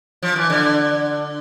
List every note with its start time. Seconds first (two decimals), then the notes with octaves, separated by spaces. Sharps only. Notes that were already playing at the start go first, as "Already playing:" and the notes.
0.23 F3
0.36 E3
0.50 D3